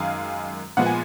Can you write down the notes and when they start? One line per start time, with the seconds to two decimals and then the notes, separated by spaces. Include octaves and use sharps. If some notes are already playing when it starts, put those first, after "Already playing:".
Already playing: F#2 D#3 G#3 F5 G#5
0.77 A#2 F3 G#3 B3 F#5
0.86 G#5